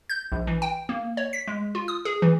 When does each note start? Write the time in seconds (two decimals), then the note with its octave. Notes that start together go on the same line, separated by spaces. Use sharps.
0.10 G6
0.32 A#1
0.47 E3
0.62 G5
0.89 A#3
1.17 C#5
1.33 B6
1.48 G#3
1.75 F4
1.88 D#6
2.05 G#4
2.22 E3